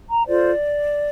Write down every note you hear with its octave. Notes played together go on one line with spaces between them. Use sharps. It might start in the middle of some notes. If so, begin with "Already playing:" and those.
A#5
F4 A4 C5 D5